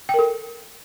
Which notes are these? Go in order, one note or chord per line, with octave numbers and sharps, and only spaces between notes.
A4 A#4 G5